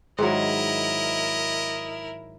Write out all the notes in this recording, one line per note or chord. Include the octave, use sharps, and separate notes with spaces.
G#2 D#3 F#3 E4 A#4 D#5